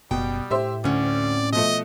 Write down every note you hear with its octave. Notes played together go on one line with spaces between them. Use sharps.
F#1 B2 G3 G5
A2 G4 C5 E5
D2 C4 C#4 D5
B2 F3 A3 D#5